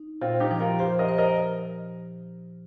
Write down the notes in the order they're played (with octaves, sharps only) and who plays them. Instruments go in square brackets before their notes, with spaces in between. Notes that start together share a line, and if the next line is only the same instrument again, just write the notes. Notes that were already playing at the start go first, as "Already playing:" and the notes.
Already playing: [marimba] D#4
[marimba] A#2 [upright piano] C4 F4
[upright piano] D#4 G4
[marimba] F3
[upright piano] F4 A#4
[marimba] G4 [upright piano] C5 F5
[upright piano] A#4 D#5
[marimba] C5
[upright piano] A#4 D#5